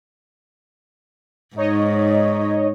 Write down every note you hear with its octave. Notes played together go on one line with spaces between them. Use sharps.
G#2 D#4 C#5 D#5